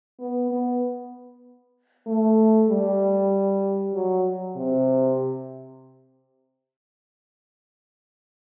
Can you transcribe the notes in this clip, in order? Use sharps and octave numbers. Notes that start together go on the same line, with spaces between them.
B3
B3
A3
G3
F#3
C3